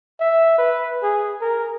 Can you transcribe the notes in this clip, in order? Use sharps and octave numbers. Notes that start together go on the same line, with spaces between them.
E5
B4
G#4
A#4